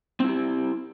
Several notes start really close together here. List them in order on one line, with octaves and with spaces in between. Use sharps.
C4 E4 G4